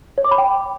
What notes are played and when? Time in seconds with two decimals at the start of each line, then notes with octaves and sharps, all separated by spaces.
0.18 C#5
0.25 D6
0.31 B5
0.38 G5